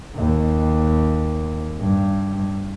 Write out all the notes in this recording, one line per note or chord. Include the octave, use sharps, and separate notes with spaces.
D#2
G2